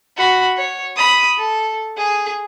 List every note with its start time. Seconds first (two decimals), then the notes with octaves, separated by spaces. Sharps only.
0.17 F#4 B5
0.57 C#5
0.96 B5 D#6
1.38 A4
1.97 G#4